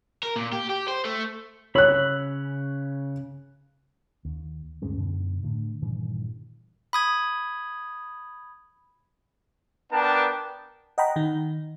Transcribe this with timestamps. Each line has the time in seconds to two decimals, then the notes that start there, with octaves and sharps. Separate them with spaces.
0.23 A#4
0.36 A#2
0.52 G4
0.69 G4
0.88 C5
1.04 A3
1.75 C#3 C#5 B5 E6 F#6
4.25 D#2
4.82 D2 G2 G#3 C#4
4.97 F#2 B2 D3
5.43 A2 D3
5.82 G2 A#2 D#3 E3
6.93 B5 D#6 G#6
9.91 B3 D4 A#4 G5 A5
10.98 D#5 F#5 G5 A#5 B5
11.16 D#3 D#4